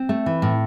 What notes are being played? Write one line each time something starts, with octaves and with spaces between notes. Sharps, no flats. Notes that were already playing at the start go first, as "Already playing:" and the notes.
Already playing: C4
A3
E3
A2